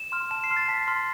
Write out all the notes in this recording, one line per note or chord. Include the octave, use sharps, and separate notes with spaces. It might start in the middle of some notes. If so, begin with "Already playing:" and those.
Already playing: E7
C6 F6
A5 E7
C7
C6 F6
A6
A5 B6
C6 F6